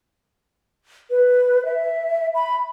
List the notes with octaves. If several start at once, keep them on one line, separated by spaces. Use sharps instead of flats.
B4
E5
B5